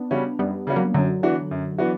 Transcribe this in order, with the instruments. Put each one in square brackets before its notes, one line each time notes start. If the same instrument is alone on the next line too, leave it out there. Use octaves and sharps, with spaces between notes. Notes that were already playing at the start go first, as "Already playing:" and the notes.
Already playing: [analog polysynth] B3 D4
[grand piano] C#3 G3 C#4 F#4
[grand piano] F#2 [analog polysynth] G3 B3
[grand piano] C#3 G3 C#4 F#4
[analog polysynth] F#3 A#3
[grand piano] F#2 [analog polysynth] D3 F#3
[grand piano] E3 B3 D4 F#4
F#2
E3 B3 D4 F#4